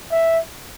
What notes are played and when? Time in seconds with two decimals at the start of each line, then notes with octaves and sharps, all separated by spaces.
0.12 E5